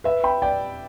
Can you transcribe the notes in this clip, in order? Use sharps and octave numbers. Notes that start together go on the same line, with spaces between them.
B4 E5
G5 B5
D5 G5